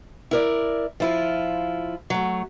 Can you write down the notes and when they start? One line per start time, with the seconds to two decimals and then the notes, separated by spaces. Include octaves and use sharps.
0.31 E4 A#4 D5
1.00 F3 E4 F4
2.10 F#3 A3